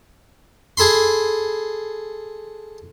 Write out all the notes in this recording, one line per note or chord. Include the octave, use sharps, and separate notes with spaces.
G#4 A4 B5 C6